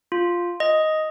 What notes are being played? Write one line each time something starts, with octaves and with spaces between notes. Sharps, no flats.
F4
D#5